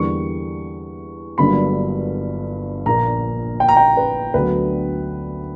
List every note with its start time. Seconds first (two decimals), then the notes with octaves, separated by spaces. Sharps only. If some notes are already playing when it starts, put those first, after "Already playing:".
Already playing: E2 D3 G3 A#3 C#6
1.38 G1 G2 D3 F#3 A#3 B5
2.86 A#1 A#2 A#3 A#5
3.60 G5
3.69 A#5
3.77 G5
3.97 B4
4.34 D2 D3 F#3 B3 B4